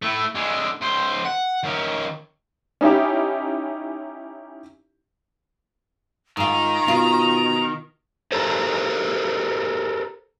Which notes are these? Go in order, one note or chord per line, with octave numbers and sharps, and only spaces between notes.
A3 E4
D3 G#3
C#2 C5
F#5
D#3 C#4
C#4 D#4 E4 G4
G#2 D#3 F4 A#5
B2 F4
G4 A4 A#4 C5